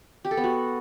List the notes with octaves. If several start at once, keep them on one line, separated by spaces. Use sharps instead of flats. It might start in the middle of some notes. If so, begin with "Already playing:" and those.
G4
A4
B3
F#4